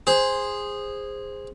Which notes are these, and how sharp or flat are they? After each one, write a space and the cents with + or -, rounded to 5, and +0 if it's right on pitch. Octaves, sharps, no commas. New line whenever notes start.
G#4 -15 C5 +0